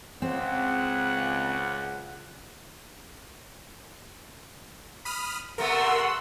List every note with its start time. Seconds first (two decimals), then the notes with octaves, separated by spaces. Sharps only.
0.22 C#2 C#3 C4 F#5
5.05 B5 D#6 F6
5.58 C3 A3 B3 A#4 F#5 C6 E6